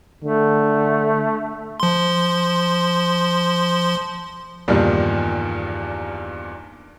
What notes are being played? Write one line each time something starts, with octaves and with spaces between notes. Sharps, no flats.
D3 A3
F3 C6
E2 G2 A#2 D#3 F3 G3